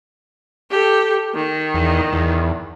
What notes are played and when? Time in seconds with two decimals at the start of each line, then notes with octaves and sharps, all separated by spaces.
0.71 G4 A4
1.35 D#3
1.74 E2
2.13 E2